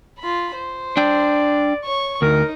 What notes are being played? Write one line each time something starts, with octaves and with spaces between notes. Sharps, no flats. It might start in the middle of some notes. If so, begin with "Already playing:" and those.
F4 B5
C5
D4 D5 G5
C#5 C#6
D2 D#4 A#4